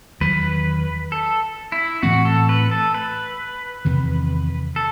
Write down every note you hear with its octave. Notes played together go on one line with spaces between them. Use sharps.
E2 D#3 F#3 B4
A4
E4
A2 E3 A3 C4 F#4
A4
B4
A4
B4
E2 C3 D#3
A4